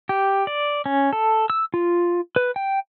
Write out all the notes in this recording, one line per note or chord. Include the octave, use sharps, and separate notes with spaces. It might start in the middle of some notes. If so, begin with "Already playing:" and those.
G4
D5
C#4
A4
E6
F4
B4
G5